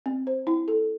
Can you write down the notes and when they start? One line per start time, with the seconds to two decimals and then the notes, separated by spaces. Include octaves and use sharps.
0.06 C4
0.27 C5
0.47 E4
0.68 A4